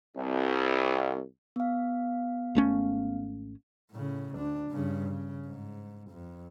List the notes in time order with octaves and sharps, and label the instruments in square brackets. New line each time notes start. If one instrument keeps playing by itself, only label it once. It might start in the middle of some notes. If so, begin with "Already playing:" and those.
[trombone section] C2
[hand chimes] B3 F5
[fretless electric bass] G#1 A3 C#4
[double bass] A2 C#3
D2 D4
G2 C#3
C#3
G#2
F2